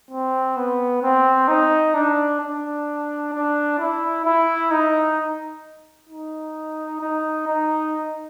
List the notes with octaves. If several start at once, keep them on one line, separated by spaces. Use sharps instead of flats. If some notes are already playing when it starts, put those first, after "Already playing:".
C4
B3
C4
D#4
D4
D4
D4
E4
E4
D#4
D#4
D#4
D#4